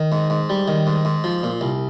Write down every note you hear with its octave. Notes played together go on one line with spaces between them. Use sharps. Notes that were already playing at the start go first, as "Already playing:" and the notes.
Already playing: D#3
G#2
G#2
G3
D#3
G#2
G#2
F3
A#2
C2